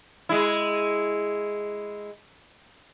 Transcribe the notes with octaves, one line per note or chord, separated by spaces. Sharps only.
G#3 E4